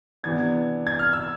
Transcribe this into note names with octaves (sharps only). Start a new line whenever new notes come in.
C3 E3 B3 D4 G#6
G#6
F6
E6